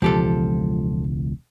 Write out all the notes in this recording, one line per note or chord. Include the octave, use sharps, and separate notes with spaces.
E1 C#2 F3 G4 A4